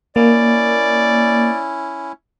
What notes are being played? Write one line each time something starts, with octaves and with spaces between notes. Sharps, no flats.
A#3 C#4 E4 D5